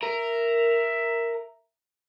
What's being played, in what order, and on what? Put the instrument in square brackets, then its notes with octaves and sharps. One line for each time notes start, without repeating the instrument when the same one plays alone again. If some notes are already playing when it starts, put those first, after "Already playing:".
[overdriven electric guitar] A#4 [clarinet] E5